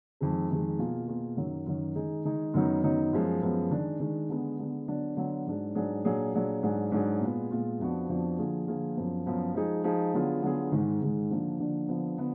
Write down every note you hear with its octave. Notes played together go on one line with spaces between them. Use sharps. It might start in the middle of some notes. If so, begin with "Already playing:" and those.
F2 D#3 G#3
F2 D#3 G#3
B2 A#3 F4 G#4
B2 A#3 F4 G#4
F#2 D#3 F#3
F#2 D#3 F#3
D#3 G#3 D#4 G#4
D#3 G#3 D#4 G#4
F#2 D#3 F#3 B3 D#4
F#2 D#3 F#3 B3 D#4
F#2 F3 G#3 B3
F#2 F3 G#3 B3
D#3 G#3 D4
D#3 G#3 D4
D3 G#3 B3
D3 G#3 B3
D3 F#3 B3 D4
D3 F#3 B3 D4
G#2 F#3 D4 G#4
G#2 F#3 D4 G#4
A#2 F#3 D4 G#4
A#2 F#3 D4 G#4
G#2 F#3 D4 G#4
G#2 F#3 D4 G#4
A#2 G#3 B3 F4
A#2 G#3 B3 F4
F2 F3 B3 D4 F#4
F2 F3 B3 D4 F#4
D3 F3 A#3 F4 G#4
D3 F3 A#3 F4 G#4
F#2 F3 B3
F#2 F3 B3
F3 G#3 D#4 G#4
F3 G#3 D#4 G#4
D3 F#3 B3 F4 G#4
D3 F#3 B3 F4 G#4
G#2 D#3 G#3
G#2 D#3 G#3
D3 F3 A#3 D4
D3 F3 A#3 D4
D3 F3 B3
D3 F3 B3